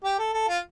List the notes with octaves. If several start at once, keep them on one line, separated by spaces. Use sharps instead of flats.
G4
A4
A4
F4